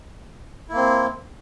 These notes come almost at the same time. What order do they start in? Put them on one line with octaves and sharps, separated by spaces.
E4 A#3 C4